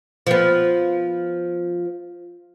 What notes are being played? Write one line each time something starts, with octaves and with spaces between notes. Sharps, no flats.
F3 B3